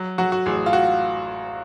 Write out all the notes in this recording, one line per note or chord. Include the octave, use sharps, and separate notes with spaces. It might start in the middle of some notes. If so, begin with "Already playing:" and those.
Already playing: F#3
F#3 F#4
F#4
A1 G#4
F4
F#4